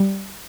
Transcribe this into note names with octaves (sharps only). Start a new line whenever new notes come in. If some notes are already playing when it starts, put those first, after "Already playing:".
Already playing: G3